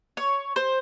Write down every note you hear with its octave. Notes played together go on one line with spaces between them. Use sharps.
C#5
C5